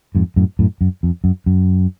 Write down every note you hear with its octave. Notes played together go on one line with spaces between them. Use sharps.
F2 G#2
F#2 A2
F#2 A2
F#2
F2
F#2
F#2